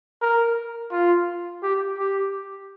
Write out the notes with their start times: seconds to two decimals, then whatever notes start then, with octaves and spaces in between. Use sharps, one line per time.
0.22 A#4
0.92 F4
1.63 G4
1.98 G4